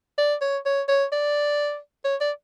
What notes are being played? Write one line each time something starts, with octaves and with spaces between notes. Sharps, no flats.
D5
C#5
C#5
C#5
D5
C#5
D5